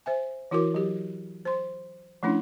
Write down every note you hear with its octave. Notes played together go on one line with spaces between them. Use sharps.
C5 E5 G#5
E3 E4 F#4 A#4 D6
F#3 G4
C5 C6
F3 A3 C#4 D4 E4